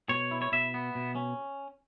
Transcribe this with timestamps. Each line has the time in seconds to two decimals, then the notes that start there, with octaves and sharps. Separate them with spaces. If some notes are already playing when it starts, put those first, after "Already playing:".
0.09 B2 C#5
0.31 E4
0.42 C#5
0.52 B2 E5
0.74 B3
0.95 B2
1.15 C#4